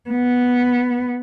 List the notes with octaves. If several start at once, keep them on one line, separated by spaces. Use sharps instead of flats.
B3